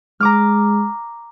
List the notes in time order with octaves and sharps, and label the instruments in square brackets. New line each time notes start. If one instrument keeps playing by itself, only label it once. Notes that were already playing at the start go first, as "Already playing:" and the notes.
[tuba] G#3 [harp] A#5 D6 F6